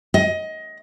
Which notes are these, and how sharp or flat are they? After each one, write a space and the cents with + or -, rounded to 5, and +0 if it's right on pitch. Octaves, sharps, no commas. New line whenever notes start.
D#5 +20